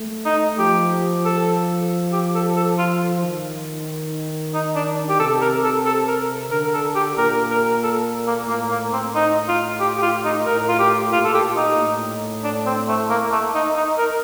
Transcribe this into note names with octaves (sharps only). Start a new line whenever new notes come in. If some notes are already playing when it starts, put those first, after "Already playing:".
Already playing: A3
D#4
F3 G4
A4
G4
A4
A4
F4
D#3
D#4
D4
G4
C3 A4
A#4
A4
A4
A#4
D3 A#4
A4
G4
A#2 A#4
A#4
A4
A#3
A2 A#3
A#3
C4
D#4
F4
G4
G4
F4
D#4
A2 A#4
F4
G4
A#2 F4
A4
G4
D#4
A2
D4
C4
A3
A#3
A3
D#4
D#4
A#4